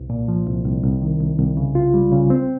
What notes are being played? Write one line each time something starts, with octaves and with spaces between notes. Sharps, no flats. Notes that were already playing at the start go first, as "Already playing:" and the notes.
Already playing: C2
A#2
F3
C2
C2
C2
D#3
C2
C2
C#3
F4
G3
C#3
C4